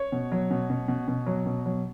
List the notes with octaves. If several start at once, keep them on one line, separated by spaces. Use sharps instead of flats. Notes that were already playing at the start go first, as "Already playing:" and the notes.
Already playing: C#5
B2
F#3
B2
B2
B2
B2
F#3
B2
F#3